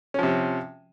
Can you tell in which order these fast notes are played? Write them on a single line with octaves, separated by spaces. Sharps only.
C#4 F3 C3